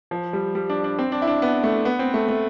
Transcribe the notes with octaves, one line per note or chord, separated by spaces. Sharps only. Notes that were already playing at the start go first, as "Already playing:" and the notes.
F3
G3
G3
D4
D4
C4
D4
E4
D4
B3
A3
B3
C4
A3
A3